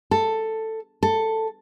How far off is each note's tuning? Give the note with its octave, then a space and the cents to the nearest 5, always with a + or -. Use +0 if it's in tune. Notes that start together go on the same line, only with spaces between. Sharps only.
A4 +10
A4 +10